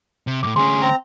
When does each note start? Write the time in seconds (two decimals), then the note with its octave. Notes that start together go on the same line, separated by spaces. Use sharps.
0.27 C3
0.43 F#2 A2 D6
0.56 D2 C#4 G#4 C6
0.81 C4 A#5